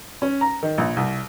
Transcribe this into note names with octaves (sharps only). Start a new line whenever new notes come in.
C#4
A#5
D#3
A#1
C2